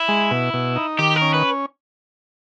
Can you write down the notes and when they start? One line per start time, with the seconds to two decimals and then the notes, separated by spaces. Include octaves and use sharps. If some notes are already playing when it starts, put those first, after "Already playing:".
Already playing: E4
0.08 G#3
0.31 B2
0.54 B2
0.76 D#4
0.99 D#3 G4
1.16 A#4
1.21 C#4
1.34 B4